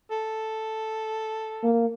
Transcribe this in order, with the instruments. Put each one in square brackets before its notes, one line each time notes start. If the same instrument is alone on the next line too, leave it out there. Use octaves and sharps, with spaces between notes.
[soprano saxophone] A4
[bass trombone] A#3